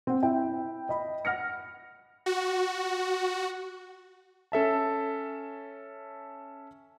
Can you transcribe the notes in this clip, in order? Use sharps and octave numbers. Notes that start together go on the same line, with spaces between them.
C4 F#5
E4 E5 G5
D#5 B5
F#5 F6 A#6 C#7
F#4
C#4 A4 E5 A5